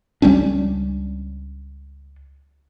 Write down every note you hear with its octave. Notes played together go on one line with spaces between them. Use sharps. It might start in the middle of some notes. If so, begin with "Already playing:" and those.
C#2 G3 C#4 D4